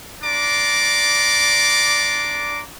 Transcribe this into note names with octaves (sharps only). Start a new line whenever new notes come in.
D4 D5 A#5 C6 D6